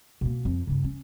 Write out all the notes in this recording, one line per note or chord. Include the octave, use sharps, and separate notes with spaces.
B2 A#3
F2 F3
G2 C#3
C#4